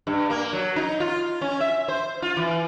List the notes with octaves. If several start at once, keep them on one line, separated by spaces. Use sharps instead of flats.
G2
A#3
F#3
D#4
F4
C#4
E5
C5
F4
E3